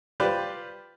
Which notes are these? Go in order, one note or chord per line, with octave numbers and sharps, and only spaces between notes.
F4 G4 B4 C5 D5